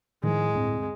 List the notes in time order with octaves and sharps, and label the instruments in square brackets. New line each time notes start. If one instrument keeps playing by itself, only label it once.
[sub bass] A2 [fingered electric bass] D#3 F3 [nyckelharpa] G#3
[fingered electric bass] D2 G2 C4